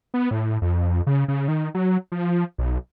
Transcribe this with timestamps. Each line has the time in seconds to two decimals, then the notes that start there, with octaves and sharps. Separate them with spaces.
0.14 B3
0.31 A2
0.62 F2
1.07 C#3
1.28 C#3
1.48 D#3
1.75 F#3
2.12 F3
2.58 B1